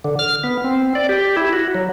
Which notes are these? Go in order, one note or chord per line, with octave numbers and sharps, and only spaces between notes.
D3
F6
B3
C4
D5
G4
E4
F#4
F#3